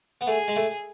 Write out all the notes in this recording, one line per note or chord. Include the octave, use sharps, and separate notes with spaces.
B3
A3 G#4
G#3
A3